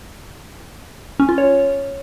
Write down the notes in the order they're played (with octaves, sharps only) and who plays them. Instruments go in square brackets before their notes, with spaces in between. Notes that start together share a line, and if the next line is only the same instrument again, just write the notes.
[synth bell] C#4
F4
C#5